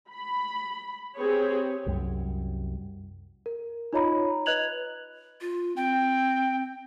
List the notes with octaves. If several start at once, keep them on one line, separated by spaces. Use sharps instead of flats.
B5
C4 G4 G#4 B4 C#5
C2 F#2 G3
A#4
D#4 F4 C#5 D#5 A#5 B5
B4 D#5 F#6 G#6 F7 F#7
F4
C4 G5